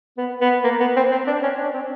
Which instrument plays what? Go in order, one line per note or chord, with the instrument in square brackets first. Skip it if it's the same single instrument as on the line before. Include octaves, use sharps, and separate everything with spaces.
[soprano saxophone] B3
B3
A#3
B3
C4
C4
D4
C#4
D4
C4